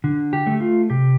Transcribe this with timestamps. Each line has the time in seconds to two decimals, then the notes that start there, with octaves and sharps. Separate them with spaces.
0.04 D3
0.33 G4
0.47 A3
0.61 F4
0.90 C3 G4